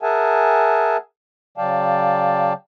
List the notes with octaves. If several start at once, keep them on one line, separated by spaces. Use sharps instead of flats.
G#4 A#4 E5 F#5 G#5 A5
C#3 F#3 D5 F5 G5 A5